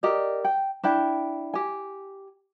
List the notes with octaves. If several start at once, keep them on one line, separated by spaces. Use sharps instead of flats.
G4 A#4 D5 D#5
G5
D4 E4 G5
G4 G#5